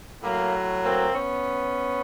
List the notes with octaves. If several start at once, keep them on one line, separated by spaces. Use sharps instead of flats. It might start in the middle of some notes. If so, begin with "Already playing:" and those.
A2 F#3 A#3
A#3 C4
B3 C#4